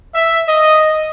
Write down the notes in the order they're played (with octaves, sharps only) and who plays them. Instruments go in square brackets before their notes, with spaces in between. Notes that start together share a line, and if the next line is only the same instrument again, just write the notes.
[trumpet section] E5
D#5